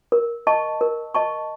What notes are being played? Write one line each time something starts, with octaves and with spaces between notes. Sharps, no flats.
A#4
D#5 A5 C#6
A#4
D#5 A5 C#6